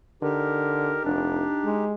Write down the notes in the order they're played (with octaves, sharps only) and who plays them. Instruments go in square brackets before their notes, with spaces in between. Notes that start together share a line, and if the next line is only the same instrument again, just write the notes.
[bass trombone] D3 [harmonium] D#4 G4 [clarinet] A#4
[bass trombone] F1 [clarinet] D4
[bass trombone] G#3